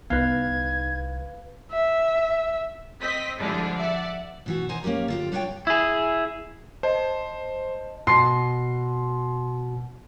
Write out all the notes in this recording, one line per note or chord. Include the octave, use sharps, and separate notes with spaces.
C2 B3 D#4 B4 F5 G#6
E5
C4 D#5 B6
D3 F3 G3 G#3 D4 E4
D5 E5 F#5
B2 E3 F#4
D#3 C5 D#5 G#5 A#5
A#3 C#4 F4 G4 A#4
D3 F4 G4
G3 D4 F4 C#5 E5 G5
E4 G#4
C5 D#5 A5
B2 C6 C7